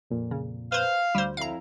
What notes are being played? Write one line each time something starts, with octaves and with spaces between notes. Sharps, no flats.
F2 A#2
C#3
B4 C5 F5
D2 G3 C5
F2 E4 F5 A#5